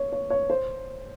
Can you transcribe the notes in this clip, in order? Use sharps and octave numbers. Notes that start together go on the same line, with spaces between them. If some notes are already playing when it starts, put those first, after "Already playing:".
Already playing: C#5
C#5
C#5
C5